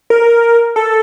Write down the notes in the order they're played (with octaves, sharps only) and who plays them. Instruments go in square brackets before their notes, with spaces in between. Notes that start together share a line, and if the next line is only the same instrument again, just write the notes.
[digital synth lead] A#4
A4